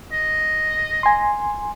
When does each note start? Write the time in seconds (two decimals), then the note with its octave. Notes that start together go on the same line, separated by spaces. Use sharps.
0.12 D#5
1.03 G#5 C6